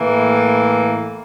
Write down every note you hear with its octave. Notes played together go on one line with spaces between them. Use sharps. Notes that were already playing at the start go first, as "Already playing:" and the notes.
Already playing: A2 E3 A#3